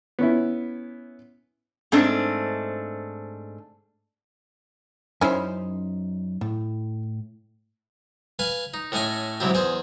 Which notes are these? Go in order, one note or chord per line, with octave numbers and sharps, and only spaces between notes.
B3 C#4 E4
G#2 A3 C4 D4
F#2 C#4 D#4 E4 C5
A2
B4 F5 G#5
D#4
A2 A3 C#4 D#5 G#5
G#2 C3 F#3 E4 G4
E2 G#4 C5